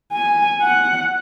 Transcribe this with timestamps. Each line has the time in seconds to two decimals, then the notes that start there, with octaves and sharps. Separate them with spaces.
0.12 G#5
0.62 F#5